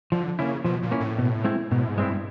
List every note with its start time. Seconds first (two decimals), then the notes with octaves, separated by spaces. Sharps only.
0.12 D3 F3
0.38 C#3 A#3 C#4 E4
0.65 B2 F3
0.82 A#2
0.91 A#3 C#4 E4
1.00 A2
1.18 B2
1.44 G#3 C4 E4
1.71 G#2 B2
1.80 A2
1.88 G#2
1.97 G2 G#3 C4 E4